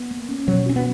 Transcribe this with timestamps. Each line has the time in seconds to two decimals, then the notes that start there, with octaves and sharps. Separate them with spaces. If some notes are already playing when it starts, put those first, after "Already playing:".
Already playing: B3
0.11 A#3
0.29 C#4
0.47 B2 F#3
0.66 C#4 F#4
0.76 B3